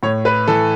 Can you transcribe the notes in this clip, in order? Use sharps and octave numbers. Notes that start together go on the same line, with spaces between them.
A2 C#5
B4
E3 A4